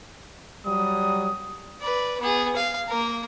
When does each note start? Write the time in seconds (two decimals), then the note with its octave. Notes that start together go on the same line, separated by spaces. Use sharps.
0.66 F#3 G3 D#6
1.81 B4 D5
2.21 B3 G#4
2.56 F5
2.88 A#3 A#4